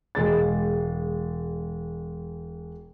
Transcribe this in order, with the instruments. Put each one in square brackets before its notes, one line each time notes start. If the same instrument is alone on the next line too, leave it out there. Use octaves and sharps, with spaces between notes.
[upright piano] E1 G#3 A6